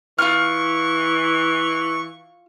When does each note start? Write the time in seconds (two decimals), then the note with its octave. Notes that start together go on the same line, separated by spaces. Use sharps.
0.18 E3 F4 C#6 F6